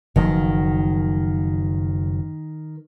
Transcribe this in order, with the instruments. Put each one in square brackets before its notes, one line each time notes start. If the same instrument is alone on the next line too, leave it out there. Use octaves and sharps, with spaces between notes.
[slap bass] F#1 F3 F#3 [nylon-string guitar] D#3